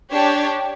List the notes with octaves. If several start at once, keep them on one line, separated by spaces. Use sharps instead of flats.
D4 G4 C#5